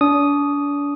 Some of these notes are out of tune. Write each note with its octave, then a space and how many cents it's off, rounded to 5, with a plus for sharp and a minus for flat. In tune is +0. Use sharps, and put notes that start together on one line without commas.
D4 -40 D#6 -5